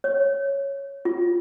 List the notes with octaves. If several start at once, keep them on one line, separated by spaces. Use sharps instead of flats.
C#5
F4